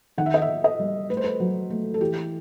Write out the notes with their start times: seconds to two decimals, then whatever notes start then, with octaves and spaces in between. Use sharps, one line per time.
0.18 D#3 F#5
0.26 E5
0.34 D#5
0.42 E5
0.49 D#3
0.64 D#5
0.79 G3
1.09 A3 B4
1.17 C5
1.24 B4
1.40 F#3
1.70 A3
1.94 A4
2.01 E3 G4